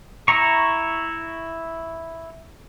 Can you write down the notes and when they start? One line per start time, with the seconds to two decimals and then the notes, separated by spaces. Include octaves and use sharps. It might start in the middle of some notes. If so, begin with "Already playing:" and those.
0.28 E4 A#5 C#6